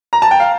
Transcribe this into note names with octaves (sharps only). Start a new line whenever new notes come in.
A#5
A5
G5
F5